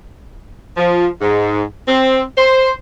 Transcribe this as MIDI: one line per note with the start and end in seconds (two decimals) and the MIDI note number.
0.77 1.07 53
1.21 1.62 44
1.88 2.22 60
2.38 2.72 72